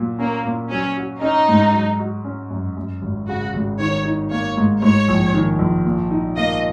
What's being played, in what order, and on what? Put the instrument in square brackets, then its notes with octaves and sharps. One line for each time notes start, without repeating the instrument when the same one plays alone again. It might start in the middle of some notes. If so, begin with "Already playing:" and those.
Already playing: [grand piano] A#2 F#3
[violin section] A#3 [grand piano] C#4
[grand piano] A#2
[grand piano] F#3 [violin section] C#4
[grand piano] F#4
[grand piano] C#4 [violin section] D#4
[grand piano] G#2
F#3
F#4
C#4
F#2
F#2
G#1
[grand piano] C#3 [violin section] F#4
[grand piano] G#1
[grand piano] D#3 [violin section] C#5
[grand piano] D#4
[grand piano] A#3 [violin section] C#5
[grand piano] G#2
[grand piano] G#2 [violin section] C#5
[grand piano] A#1
D#3
A#1
A#2
D#4
[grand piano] A#3 [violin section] D#5